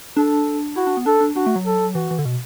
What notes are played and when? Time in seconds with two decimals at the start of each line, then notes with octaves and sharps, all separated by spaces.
0.17 D4 A4
0.76 E4 F#4
0.87 D4
0.97 B3
1.06 D4 A4
1.21 D4
1.36 D4 F#4
1.46 A3
1.56 F#3
1.66 A4
1.95 E3 F#4
2.11 E3
2.19 D3
2.25 B2